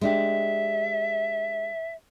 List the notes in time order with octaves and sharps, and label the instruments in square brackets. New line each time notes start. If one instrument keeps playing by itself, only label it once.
[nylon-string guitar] G#3 D4 G4 [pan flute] E5